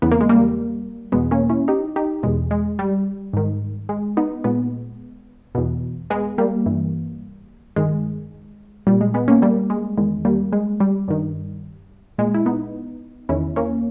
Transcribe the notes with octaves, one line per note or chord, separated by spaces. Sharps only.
E2 C#3 E3 B3
A#3
G#3
G3 A#3
E2 B2 G#3 B3
A#3 C#4
C#4 E4
D#4 G4
D#4 G4
E2 B2 G#3
G#3
G3
G#2 D#3
G#3
B3 D#4
A#2 G#3 B3
E2 B2
G#3 B3
G3 A#3
G2 E3
G2 D#3 G#3
A#2 G3
G#3
G#3 B3
A#3 C#4
G3 A#3
G#3
E2 D#3 G#3
G3 A#3
G#3
G3
G2 D#3
A#2 G#3
E4
B3 D#4
E2 D#3 C#4 E4
A#3 C#4